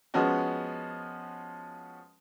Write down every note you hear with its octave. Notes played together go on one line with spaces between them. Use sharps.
F3 G#3 B3 C#4 F#4